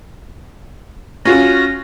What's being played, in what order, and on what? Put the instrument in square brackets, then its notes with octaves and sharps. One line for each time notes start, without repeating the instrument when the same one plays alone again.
[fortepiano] C#4 F4 F#4 [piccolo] A#6